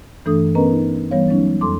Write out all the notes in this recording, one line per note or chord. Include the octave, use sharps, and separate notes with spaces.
G2 E3 A3 D4 A4 D#6
B3 C#4 A#4 B4 D#5 A#5
D#4
E3 G3 B3 C#5 F5
F#3 G#3 C#4 D#4
F2 A4 C6 D6